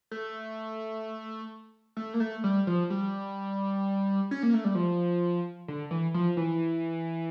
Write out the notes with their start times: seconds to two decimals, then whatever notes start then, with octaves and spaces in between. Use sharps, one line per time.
0.11 A3
1.97 A3
2.14 A#3
2.20 A3
2.44 G3
2.67 F3
2.90 G3
4.31 C#4
4.43 A#3
4.54 A3
4.65 G3
4.75 F3
5.68 D3
5.91 E3
6.14 F3
6.37 E3